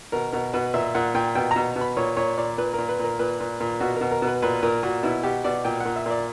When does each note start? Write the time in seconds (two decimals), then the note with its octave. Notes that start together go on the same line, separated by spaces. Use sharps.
0.12 B2 A#4
0.33 B2 A#4
0.54 B2 B4
0.74 A#2 E5
0.95 A#2 F#5
1.14 A#2 G5
1.35 B2 G5
1.51 B2 A#5
1.76 B2
1.81 B5
1.97 A#2 C#5
2.17 A#2 C#5
2.37 A#2 D5
2.58 A#2 B4
2.73 A#2 A#4
2.89 B4
2.99 A#2 A#4
3.19 A#2 B4
3.40 A#2
3.60 A#2
3.80 B2 F#4
3.96 A#4
4.01 B2
4.11 A#4
4.22 B2
4.27 B4
4.42 A#2 B4
4.63 A#2 A#4
4.83 A#2 F#4
5.03 B2 E4
5.23 B2 G4
5.44 B2 D5
5.65 A#2 G5
5.80 A#2 F#5
5.96 E5
6.06 A#2 D5